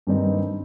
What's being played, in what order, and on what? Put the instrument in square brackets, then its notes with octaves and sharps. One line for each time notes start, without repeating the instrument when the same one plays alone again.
[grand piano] G2 D#3 G3 C4 D#4